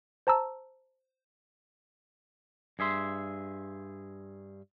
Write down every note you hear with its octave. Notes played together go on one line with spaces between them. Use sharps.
C5 A5 A#5 E6
G2 G#4 E5 C6